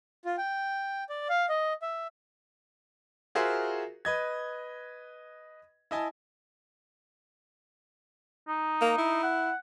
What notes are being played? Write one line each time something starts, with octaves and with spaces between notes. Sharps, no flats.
F4
G5
D5
F5
D#5
E5
F4 F#4 G#4 A#4 C5 E5
B4 D#5 G#6
E4 D#5 G#5 A5
D#4
A#3
E4
F#5